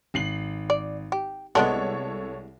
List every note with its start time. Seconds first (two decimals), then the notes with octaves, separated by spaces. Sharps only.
0.14 G#1 C7 F#7
0.70 D5
1.12 G4
1.55 C2 G#3 B3 D4 A4 C#5